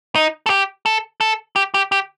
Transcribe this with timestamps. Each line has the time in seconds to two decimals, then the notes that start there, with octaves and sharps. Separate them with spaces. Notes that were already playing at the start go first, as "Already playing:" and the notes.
0.15 D#4
0.46 A4
0.50 G4
0.86 A4
1.21 A4
1.56 G4
1.74 G4
1.92 G4